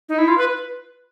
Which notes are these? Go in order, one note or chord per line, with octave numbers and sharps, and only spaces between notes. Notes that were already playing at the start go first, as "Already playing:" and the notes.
D#4
E4
F4
B4